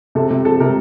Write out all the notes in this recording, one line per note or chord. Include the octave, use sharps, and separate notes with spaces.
C3 A4
C3
F3 A4
C3 A#4